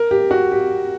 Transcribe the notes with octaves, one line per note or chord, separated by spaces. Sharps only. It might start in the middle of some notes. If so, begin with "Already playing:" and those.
Already playing: A#4
G4
F#4
G4